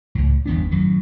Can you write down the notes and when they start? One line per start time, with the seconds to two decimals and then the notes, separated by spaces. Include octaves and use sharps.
0.15 C#2 A2
0.46 G1 E2 B3 D4
0.71 F#2 A2 D#3